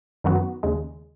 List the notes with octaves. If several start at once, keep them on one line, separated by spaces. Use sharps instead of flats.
F#2 D#3 F#3 B3 F#4
D#2 C#3 G#3